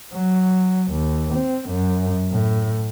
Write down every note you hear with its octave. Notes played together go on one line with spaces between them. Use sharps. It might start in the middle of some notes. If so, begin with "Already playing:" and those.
F#3
D#2
C4
F#2
A2